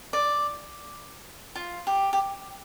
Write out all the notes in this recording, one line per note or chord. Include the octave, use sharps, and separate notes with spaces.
D5
F4
G4
G4